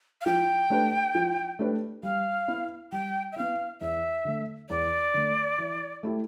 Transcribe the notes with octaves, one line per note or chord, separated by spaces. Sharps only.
F5
F3 G5
A3 D4 G4 B4
F3
A3 D4 G4 B4
G3 F5
B3 E4
G3 G5
E5
B3 E4 F5
E2 E5
D3 A3
E2 D5
D3 A3
E3
A3 E4 G4